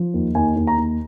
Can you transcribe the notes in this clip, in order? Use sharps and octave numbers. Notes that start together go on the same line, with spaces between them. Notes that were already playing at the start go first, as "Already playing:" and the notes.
Already playing: F3
D#2
D#2 G#5
D#2
A#5
D#2